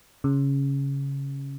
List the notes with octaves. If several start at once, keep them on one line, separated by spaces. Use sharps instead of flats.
C#3